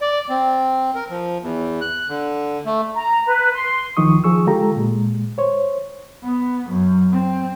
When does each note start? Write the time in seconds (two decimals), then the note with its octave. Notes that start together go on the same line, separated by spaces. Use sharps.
0.01 D5
0.29 C4
0.95 A#4
1.10 F3
1.42 E2
1.81 F#6
2.09 D3
2.66 A3
2.94 A#5
3.27 B4
3.54 C6
3.97 D2 D#3 F3 D#4 C#6 D#6
4.24 F3 G#4 C#6 E6
4.47 D3 G#3 F4 G4 A4 A#5
4.76 A#2 G#3
5.38 C5 C#5
6.23 B3
6.69 F#2
7.12 C4